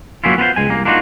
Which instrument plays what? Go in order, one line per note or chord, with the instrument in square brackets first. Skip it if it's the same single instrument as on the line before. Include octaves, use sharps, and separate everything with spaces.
[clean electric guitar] F#3 A#3 C#4 E4 F4
B3 F4 B4 C5
C#2 G#3 G#5
C2 A#3
A#3 D4 D#4 F4 F#4